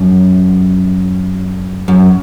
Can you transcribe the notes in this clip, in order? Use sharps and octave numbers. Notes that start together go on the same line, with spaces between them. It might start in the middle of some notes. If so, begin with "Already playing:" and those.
Already playing: F#2
F#2